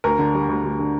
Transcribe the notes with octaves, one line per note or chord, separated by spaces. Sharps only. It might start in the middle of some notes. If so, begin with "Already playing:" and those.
D2 A#4
D3
G3
D2
D2
D3